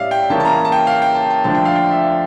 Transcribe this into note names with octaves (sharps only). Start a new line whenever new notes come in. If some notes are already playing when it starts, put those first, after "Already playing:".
Already playing: A2 G3 C#4 D5 E5 F5
G5
C#3 E3 A#3 C#4 A5
A5
A#5
A5
G5
F5
G5
A5
A5
D3 F3 A3 D4 A5
G5
F5
G5
E5
F5